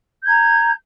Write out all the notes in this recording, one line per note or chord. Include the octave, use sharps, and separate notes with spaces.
A#5 G6 G#6